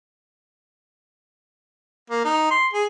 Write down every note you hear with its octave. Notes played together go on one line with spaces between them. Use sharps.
A#3
D#4
C6
G#4